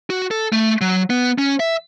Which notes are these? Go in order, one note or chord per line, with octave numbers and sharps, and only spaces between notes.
F#4
A4
A3
F#3
B3
C#4
E5